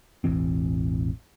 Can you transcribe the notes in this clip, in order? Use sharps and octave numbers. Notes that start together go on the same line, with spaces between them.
E1 A1 E3 C4